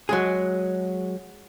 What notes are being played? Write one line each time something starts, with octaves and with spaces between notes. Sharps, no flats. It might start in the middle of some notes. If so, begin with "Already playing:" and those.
F#3 G#3 G#4